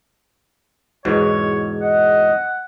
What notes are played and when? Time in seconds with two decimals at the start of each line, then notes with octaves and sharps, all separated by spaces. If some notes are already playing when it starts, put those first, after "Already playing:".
1.05 E2 G#2 B2 C#5
1.82 D#5 F#5